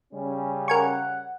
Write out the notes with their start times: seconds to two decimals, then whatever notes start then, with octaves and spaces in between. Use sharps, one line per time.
0.13 C#3 G3 C#4
0.68 A#4 F#5 G#5 C#6